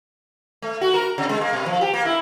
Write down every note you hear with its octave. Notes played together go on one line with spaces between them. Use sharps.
A3
F#4
A#4
C3
G#3
A#3
B2
F3
G4
A#3
E4